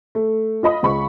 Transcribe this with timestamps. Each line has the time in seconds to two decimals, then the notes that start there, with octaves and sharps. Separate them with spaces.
0.15 A3
0.63 F4 D#5 B5 D#6
0.83 C#2 B5 C#6